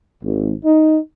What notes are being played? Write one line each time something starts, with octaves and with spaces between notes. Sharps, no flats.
G#1
D#4